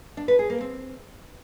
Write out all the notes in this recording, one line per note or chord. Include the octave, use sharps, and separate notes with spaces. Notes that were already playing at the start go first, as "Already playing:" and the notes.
D4
B4
G#4
A#3
C4